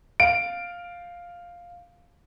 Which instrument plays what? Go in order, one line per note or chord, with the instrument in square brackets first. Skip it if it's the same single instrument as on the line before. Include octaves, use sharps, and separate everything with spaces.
[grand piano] F5 D7